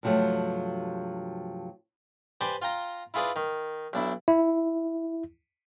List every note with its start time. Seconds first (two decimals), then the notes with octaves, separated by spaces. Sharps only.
0.03 G2 C3 F3 F#3 A3
2.41 G4 B4 C5 D5 G#5
2.62 F4 G5 A#5
3.14 E4 F4 G#4 B4 D5
3.36 D#3
3.93 B1 D4 E4
4.28 E4